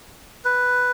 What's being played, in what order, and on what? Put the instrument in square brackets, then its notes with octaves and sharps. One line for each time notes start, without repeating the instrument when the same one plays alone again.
[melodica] B4